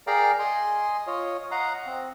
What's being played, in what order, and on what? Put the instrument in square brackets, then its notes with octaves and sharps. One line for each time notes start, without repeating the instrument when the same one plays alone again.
[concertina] G#4 A#4 D5 F5 G5 A#5
D#5 G#5 C6
F4 C#5 D#5
D#5 F5 F#5 A#5
C4